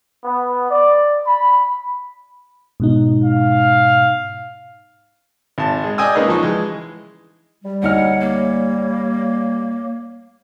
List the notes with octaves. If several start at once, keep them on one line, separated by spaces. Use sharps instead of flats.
B3
D5
B5
G#2 B2 D#4
F5
G#1 A5
G#3
D5 D#5 G5 G#5 D#6 E6
G#3 A#3 C#4 D#4 G#4 B4
F3 D#4 C#6
E3 G#3
G3
D2 D#4 C#5 F#5 F6
A#3